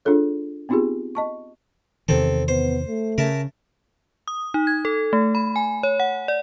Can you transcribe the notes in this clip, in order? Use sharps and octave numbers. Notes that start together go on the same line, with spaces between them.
D4 F4 G#4 A4 C#5
B3 C4 D#4 F4 G4 G#4
D#5 A5 C#6
E2 C3 D#3 C4 A4
B3 C5
A3
C#3 A#4 E5 A5
D#6
D#4
G#6
A4
A3
B5
G#5
C#5
F#5
D5